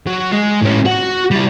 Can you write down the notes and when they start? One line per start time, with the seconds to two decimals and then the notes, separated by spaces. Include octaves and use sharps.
0.07 F#3
0.32 G#3
0.62 A2 C#4
0.85 F#4 F#5
1.31 G3 E4